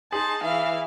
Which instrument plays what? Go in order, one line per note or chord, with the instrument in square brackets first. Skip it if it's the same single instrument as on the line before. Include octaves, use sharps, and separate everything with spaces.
[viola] D#4 [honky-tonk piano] G#4 [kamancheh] A5 [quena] C6
[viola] E3 [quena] E5 [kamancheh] F5